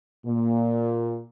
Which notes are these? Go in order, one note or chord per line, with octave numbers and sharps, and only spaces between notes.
A#2